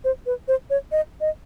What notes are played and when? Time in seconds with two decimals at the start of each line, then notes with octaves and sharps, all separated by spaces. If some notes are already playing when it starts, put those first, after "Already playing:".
0.04 C5
0.26 B4
0.48 C5
0.70 C#5
0.92 D#5
1.21 D#5